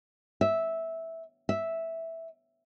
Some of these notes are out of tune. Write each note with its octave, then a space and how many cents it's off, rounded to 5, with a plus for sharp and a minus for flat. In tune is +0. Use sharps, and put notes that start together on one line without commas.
E5 -10
E5 -5